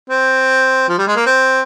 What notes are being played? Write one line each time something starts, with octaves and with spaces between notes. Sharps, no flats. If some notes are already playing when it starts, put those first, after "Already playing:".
C4
F3
G3
G#3
A#3
C4